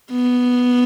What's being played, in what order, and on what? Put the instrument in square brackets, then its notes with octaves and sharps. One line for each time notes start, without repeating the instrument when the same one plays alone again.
[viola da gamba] B3